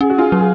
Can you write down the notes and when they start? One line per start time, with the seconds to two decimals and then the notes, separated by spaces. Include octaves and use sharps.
0.01 C#4 G#4
0.10 F#4
0.18 F4 G#4
0.32 F#3
0.39 G#4